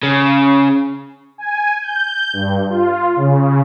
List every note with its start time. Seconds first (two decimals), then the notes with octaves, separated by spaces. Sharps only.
0.03 C#3
1.38 G#5
1.82 G6
2.33 G2
2.69 F4
3.16 C#3